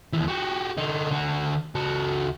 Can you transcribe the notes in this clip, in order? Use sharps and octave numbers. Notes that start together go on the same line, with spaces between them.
D#2 E3
F#4 G4
D3 D#4
D3 F#4
C#2 F#4